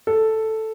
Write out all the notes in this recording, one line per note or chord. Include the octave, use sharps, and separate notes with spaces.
A4